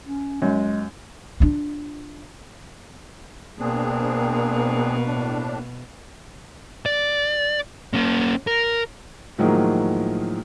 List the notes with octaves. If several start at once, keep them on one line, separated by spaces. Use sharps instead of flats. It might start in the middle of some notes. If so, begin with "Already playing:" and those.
C#4
F#2 G#3
D4 F4
B2 A#3 C4 D4 G#4
A2 D4
D5
A#3 C#4
A#4
A2 D#3 F3 F#3 G#3 A#3